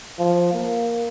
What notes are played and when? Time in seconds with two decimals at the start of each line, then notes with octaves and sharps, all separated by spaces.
0.19 F3
0.53 A#3